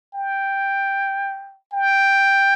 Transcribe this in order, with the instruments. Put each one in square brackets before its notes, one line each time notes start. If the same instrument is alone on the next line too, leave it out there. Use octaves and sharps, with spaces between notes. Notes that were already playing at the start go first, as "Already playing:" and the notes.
[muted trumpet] G5
G5